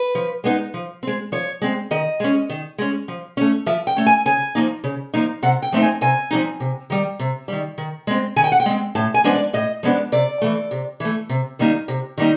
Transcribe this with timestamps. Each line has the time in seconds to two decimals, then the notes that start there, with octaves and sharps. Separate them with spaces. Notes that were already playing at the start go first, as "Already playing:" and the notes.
Already playing: B4
0.15 F3
0.44 G#3 B3 D#4
0.74 F3
1.03 G#3 C4
1.32 F3 C#5
1.62 G#3 C4
1.91 D#3 D#5
2.20 G#3 C#4
2.50 D#3
2.78 G#3 C#4
3.08 F3
3.37 A3 C#4
3.66 F3 E5
3.87 G5
3.96 A3 C#4
4.06 G#5
4.25 C#3 G#5
4.55 F3 A#3 D#4
4.84 C#3
5.14 F3 A#3 D#4
5.43 C3 F#5
5.62 G5
5.72 F3 A3 C4 D#4
5.82 G#5
6.01 C3 G#5
6.31 F3 A3 C4 D#4
6.60 C3
6.90 D#3 G3
7.19 C3
7.48 D#3 G3
7.78 D#3
8.07 G#3 C4
8.36 D#3 G#5
8.44 G5
8.52 F#5
8.60 G5
8.66 G#3 C4
8.95 A2 A5
9.14 G#5
9.24 F3 G#3 B3 D4
9.34 D5
9.53 A2 D#5
9.83 F3 G#3 B3 D4
10.12 C3 D5
10.42 E3 A3
10.71 C3
11.00 E3 A3
11.29 C3
11.59 D#3 G3 A#3 D#4
11.88 C3
12.18 D#3 G3 A#3 D#4